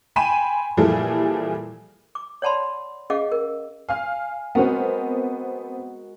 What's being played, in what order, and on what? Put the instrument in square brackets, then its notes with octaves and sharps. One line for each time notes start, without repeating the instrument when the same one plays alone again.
[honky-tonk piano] G5 G#5 B5 C6 D#7 E7
A#2 E3 F3 G3 G#4 A4
[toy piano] D6
C#5 D5 F#5 A5 B5 C6
C#4 G#4 D#5 F5 F#5 D6
A#4
[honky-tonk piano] F5 F6 [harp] G#5
[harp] G#3 F#4 A#4 [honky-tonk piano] B3 C4